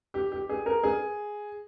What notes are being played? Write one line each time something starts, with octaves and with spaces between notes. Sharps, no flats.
G4
G4
G#4
A#4
G#4